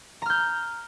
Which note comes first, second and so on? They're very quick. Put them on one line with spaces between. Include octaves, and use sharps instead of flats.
A#5 F6 G6